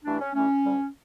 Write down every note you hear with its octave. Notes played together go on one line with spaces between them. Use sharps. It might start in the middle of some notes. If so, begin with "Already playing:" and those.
G2 E3 A3 D4
C#4
G2 E3 A3 C#4
D2 D3 G3